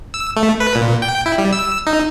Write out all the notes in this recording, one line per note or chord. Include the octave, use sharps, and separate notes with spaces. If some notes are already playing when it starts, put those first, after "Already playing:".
E6
A3
B4
A#2
G5
E4
G3
E6
D#4